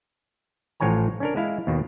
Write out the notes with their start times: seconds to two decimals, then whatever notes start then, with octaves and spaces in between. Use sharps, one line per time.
0.80 A1 A2 F3 C#5 G#5 A#5
1.20 C#4 D4 A#4
1.36 G#3 E4 F5
1.67 D#2 B2 D#3